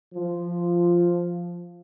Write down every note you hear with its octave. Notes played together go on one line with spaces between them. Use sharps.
F3